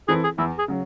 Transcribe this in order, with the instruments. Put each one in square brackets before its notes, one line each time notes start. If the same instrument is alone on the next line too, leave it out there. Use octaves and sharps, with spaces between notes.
[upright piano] E3 C4 E4 A4 [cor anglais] G#4
[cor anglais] G#4
[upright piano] E2 [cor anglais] E4
[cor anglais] G#4
[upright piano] C#3 F#3